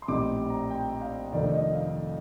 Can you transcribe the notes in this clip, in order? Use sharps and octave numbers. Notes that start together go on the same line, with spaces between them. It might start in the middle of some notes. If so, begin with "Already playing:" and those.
C6
A#1 A2 G3 C4 D#4 D6
A#5
G5
F5
F1 F2 D#3 A3 D4 D5
D#5
F5